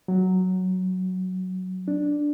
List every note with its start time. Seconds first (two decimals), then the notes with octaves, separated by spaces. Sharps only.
0.08 F#3
1.88 D4